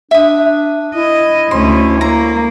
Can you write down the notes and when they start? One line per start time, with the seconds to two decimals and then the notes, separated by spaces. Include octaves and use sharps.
0.11 D4 E5 D#6
0.95 E4 D#5
1.51 D2 C#4 C6
2.01 A#3 A#5